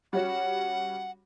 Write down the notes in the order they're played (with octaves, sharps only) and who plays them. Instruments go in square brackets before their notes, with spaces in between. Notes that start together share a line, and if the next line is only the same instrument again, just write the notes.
[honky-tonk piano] G3 C#4 F#4 [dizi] F#5